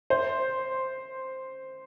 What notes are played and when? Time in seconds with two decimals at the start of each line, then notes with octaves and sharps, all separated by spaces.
0.10 C5